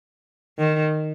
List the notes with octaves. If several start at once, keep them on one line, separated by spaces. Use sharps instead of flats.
D#3